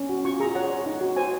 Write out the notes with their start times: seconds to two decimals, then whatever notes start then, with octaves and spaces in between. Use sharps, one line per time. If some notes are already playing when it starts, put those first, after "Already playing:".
Already playing: C#4
0.09 F#4
0.25 F4 C#6
0.40 G#4 A#5
0.55 C#5 F#5
0.70 C#5
0.86 D#4
1.01 F#4
1.16 C5 G#5